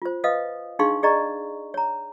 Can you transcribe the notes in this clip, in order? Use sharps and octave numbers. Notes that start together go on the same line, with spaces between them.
F4 C5
B4 D#5 F5 D#6
D4 D#4 G#4 F5 C6 C#6
G#4 D5 D#5 A#5 C#6
C#5 A#5